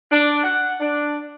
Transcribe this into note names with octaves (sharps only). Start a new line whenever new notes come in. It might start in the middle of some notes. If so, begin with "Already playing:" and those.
D4
F#5
D4